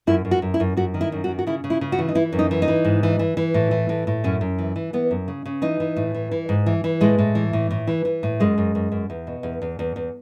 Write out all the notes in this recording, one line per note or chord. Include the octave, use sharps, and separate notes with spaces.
F#2 E4
F#2
F#4
F#2
E4
F#2
F#2 F#4
D#3
E4
F#2
F#4
D#3
F#4
C#3 E4
C#3
E4
C#3
F#4
E3
D#4
E3 E4
F#2
D#4
E3
D#4
E3
G#2
E3
E3
E3
A2
E3
A2
A2
F#2 C#4
F#2
E3
E3
E3 B3
F#2
C#3
C#3
E3 D#4
E3
A2
E3
E3
G#2
E3
E3
A2 G#3
A2
E3
A2
A2
E3
E3
A2
F#2 G#3
F#2
F#2
F#2
E2
B2
E2
E2
E2
E2